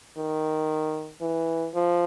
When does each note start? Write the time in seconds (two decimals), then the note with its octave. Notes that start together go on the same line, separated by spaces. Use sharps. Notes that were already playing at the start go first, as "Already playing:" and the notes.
0.17 D#3
1.21 E3
1.74 F3